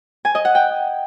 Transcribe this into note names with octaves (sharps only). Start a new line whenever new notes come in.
G#5
D#5
F#5
G5